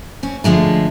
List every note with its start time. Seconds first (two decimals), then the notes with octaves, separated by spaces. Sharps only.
0.23 C4 C#4
0.44 D3 F3 G#3 A3